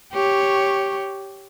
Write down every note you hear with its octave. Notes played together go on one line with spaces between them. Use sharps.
G4 C#5